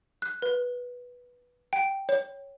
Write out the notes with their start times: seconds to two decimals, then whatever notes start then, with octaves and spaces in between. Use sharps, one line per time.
0.22 F#6
0.42 B4
1.73 G5
2.09 C#5